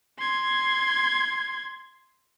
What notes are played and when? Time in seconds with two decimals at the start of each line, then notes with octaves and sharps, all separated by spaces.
0.19 C6 G#6